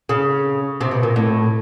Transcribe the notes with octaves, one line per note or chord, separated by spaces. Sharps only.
C#3
C3
B2
A#2
A2